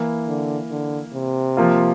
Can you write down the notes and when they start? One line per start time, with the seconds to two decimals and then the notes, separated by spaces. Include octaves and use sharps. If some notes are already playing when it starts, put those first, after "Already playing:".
Already playing: E3 A#3 E4
0.28 D3
0.71 D3
1.14 C3
1.57 F3 A#3 F4